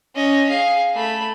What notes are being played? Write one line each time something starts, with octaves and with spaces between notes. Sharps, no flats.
C#4 D#5
G#4 F5
A3 B5